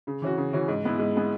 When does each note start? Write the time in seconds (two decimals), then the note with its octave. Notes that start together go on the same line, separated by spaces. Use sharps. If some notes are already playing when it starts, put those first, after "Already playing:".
0.07 C#3
0.22 E3 C#4 F#4
0.38 C#3
0.53 E3 C#4 F#4
0.68 G#2
0.84 G#3 B3 E4
0.99 G#2
1.15 G#3 B3 E4